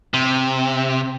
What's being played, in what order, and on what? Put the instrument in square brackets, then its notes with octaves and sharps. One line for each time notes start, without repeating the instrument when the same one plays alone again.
[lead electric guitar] C3